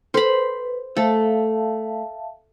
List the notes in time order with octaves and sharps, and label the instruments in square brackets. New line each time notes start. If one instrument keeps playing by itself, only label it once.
[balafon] A4 [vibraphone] B4 [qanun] C5 B5
[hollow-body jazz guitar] A3 [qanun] A4 [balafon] C5 [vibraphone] E5 F5 A5